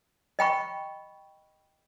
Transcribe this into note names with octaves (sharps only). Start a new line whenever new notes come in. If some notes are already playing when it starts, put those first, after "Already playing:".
D#5 G5 B5 C#6